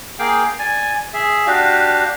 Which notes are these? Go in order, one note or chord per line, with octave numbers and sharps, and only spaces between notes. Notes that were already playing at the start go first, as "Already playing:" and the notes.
A#3 G#4 F5 G5
D5 G#5
G#4 E5
D4 F#4 G4 F5